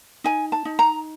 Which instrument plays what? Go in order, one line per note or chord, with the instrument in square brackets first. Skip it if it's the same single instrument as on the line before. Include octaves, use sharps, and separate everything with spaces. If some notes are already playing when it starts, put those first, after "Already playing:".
[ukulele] D#4 G#5
A5
D#4
A#5